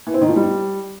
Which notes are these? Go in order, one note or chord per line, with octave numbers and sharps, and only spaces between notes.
E3
C4
D#3
F3
G3